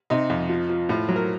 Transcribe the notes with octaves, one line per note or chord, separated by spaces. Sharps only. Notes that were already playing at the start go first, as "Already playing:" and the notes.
C3 D#4
F2
F3
F3
A2 F4
F#3
A#4